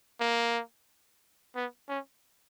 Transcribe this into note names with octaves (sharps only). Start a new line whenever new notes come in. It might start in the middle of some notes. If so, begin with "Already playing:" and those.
A#3
B3
C#4